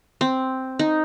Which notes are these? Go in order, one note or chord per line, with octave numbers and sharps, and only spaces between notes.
C4
D#4